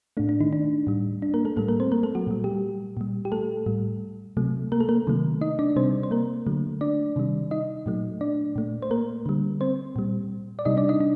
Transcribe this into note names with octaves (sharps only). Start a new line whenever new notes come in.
A2 A3 D4
D4
D#3 D#4
D4
A2 G3
D4
A#3 A#4
A3 A4
A2 G3 A3 A4
A#3 A#4
C4 C5
A#3 A#4
A3 A4
F#3 F#4
A#2 G3
G3 G4
A#2 G3
G4
A3 A4
A2 G3
C3 F#3 A3
A#3 A#4
A3 A4
A#3 A#4
C3 D#3 F#3 A3
D#4 D#5
D4 D5
C3 G3 C4 C5
C5
A#3 A#4
D3 F#3 A3
D4 D5
C3 D#3 G3
D#4 D#5
A#2 F#3 A3
D4 D5
A#2 A3
C5
A#3 A#4
D3 G3
C4 C5
A#2 G3
D5
C3 G3 D#4 D#5
D4 D5
D#4 D#5
D4